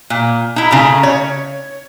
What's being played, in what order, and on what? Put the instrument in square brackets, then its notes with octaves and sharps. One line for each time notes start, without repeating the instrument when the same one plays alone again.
[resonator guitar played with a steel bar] A#2
D#4 E4
C#3 A3 A#5
C#5